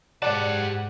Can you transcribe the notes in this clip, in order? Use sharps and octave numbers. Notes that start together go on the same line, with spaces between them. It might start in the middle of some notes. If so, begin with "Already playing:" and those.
G#2 G4 D5 F#5 A5